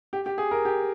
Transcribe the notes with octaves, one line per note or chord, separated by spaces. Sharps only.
G4
G4
G#4
A#4
G4